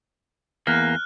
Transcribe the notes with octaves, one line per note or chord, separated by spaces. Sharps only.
E2 A#3 F6 F#6